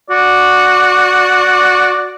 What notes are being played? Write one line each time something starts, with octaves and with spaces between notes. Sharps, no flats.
F#4 D5